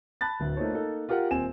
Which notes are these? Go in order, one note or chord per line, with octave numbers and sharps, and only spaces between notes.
A5 B5 F#6 A6
D1 D2
A3 A#3 D#4 F4 C5 C#5
A#3 D#4 A4
F4 G4 A#4 F#5
D#1 C4 G#5 E7